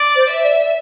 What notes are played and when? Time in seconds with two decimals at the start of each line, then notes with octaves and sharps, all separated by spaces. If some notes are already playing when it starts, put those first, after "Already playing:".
Already playing: D5
0.16 C5
0.29 E5
0.44 D5